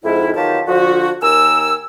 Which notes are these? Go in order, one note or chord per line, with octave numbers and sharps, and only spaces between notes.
F2 G#2 E4
E2 D#3 F#3 F4 G4 A5
D3 F3 F#4
D#2 A#4 G#5 E6